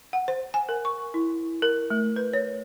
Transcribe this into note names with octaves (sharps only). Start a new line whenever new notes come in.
F#5
C5
G#5
A#4
C#6
E4
A#4
A3
B4
C#5